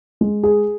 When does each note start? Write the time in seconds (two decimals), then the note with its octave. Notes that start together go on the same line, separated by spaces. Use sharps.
0.21 G#3
0.43 G#4